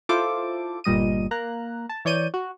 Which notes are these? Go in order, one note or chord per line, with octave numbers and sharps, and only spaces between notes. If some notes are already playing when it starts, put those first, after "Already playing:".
E4 F4 A4 C5 D6
G1 A#2 G3 D#5 D#7
A#3 A#5 F#6
A5
E3 C#5 D5 G6 D#7
F#4